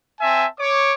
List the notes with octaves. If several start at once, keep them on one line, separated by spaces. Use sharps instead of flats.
C4 E5 G#5 A5
C#5 D6